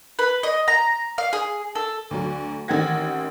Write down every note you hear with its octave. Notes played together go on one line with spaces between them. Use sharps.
B4
D#5
A#5
F5
G#4
A4
D2 D3 F#3
A1 D#3 C4 F#5 G#6 A#6